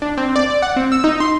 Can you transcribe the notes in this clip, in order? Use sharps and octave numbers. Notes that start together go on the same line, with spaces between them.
D4
C4
D5
D5
F#5
C4
E6
D#4
C6